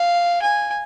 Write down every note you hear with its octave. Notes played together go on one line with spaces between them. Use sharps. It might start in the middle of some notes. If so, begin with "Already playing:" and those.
Already playing: F5
G#5